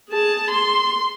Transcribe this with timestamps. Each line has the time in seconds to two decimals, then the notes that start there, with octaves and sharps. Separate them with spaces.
0.10 G#4 A5
0.51 C6